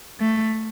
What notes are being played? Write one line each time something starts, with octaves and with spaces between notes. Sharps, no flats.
A3